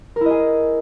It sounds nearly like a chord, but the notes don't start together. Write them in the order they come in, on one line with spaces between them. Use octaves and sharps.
A#4 E4 D#5 G#4